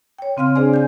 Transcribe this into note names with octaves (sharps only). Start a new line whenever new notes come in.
C#5 G5
C#3 C4 F5 C6 F6
D4 G#4 C5 D5 G#5
G#5 G6